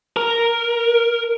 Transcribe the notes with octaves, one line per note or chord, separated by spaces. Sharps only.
A#4